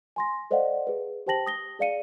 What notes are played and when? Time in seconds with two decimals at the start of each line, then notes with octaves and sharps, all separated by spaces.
0.16 G#5 C6 A#6
0.51 A4 C5 D5 D#5 F5 F#5
0.87 G#4 B4
1.27 G4 C5 G5 A5 A#6 F#7
1.46 D#6 A#6 G7
1.79 G#4 D5 F5 C#7 D#7